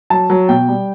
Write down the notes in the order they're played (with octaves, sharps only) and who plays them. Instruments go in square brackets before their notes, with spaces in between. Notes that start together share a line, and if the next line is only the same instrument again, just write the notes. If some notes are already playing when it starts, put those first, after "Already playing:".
[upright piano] F#3 A5
F#3
B2 G5
G3